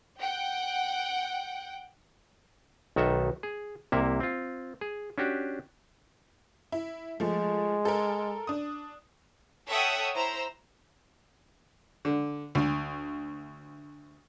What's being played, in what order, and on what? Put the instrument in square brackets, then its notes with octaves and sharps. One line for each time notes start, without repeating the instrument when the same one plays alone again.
[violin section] F#5 G5
[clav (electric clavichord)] B1 D#3 F#4 A4 E5
G#4
C2 C3 A#3 E4 E5
C4 F4
G#4
C#4 D4 F#4 G4
[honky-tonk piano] E4
[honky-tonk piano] F3 A3 [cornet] G#3
[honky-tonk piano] A4 A#4
D4 D#6
[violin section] A4 C#5 E5 F#5 G5 D#6
E4 C5 A#5 E6
[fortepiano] D3
D2